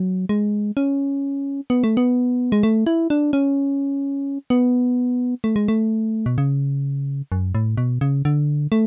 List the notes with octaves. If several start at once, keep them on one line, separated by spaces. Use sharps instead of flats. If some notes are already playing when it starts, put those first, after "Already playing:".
Already playing: F#3
G#3
C#4
B3
A3
B3
G#3
A3
E4
D4
C#4
B3
A3
G#3
A3
B2
C#3
F#2
A2
B2
C#3
D3
A3